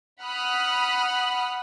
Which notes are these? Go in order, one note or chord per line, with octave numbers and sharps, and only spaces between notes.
F#5 B5 D#6 F6 F#6